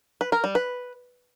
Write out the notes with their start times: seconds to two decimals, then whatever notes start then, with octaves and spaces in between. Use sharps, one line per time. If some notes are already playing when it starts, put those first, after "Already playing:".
0.21 B4
0.32 A#4
0.44 G3
0.55 B4